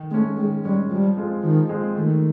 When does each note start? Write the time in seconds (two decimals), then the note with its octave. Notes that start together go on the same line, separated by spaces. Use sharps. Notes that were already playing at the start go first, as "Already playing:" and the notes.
Already playing: D#3
0.11 G#3 A3 C#4
0.37 D#3 G#3
0.64 G3 G#3 C#4
0.90 F3 G3
1.17 G#3 C4 F4 G#4
1.43 D#3 F3
1.69 G#3 C4 F4 G#4
1.95 D#3 A3